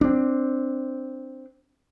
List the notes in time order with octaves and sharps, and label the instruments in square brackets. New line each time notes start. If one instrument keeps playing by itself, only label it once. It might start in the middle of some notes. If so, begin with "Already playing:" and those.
[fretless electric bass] C4 D4